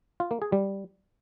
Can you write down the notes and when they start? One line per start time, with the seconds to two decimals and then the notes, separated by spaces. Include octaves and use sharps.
0.20 F4
0.31 A#3
0.42 G#4
0.52 G3